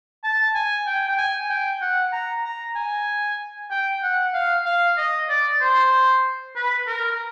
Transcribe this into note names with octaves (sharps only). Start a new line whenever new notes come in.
A5
G#5
G5
G5
G#5
G5
F#5
A#5
A#5
G#5
G5
F#5
F5
F5
D#5
D5
C5
B4
A#4